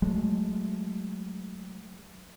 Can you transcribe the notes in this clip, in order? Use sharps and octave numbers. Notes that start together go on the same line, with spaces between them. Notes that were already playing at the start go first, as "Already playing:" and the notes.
F#3 G#3 A3